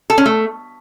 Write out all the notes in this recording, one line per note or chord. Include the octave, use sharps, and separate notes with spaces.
A4
C#4
A3